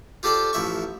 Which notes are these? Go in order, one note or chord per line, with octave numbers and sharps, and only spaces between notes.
F4 G4 A4 C5 D5
A1 F3 E5 C#6